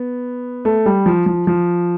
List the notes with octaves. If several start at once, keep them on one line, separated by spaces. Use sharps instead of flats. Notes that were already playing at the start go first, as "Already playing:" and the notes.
Already playing: B3
A3
G3
F3
F3
F3